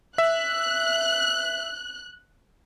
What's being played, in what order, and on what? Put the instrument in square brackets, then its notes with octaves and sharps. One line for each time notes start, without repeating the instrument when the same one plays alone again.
[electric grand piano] E5 [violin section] F#6